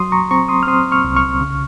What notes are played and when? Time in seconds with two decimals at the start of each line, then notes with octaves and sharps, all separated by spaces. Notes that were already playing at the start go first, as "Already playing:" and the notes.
Already playing: F#3 C6 D#6
0.12 A#5 C#6
0.31 C4 A#5 C#6
0.49 C6 D#6
0.63 F6
0.67 C4 C6 D#6
0.92 C#6 F6
1.04 C2
1.17 C#6 F6
1.41 C#3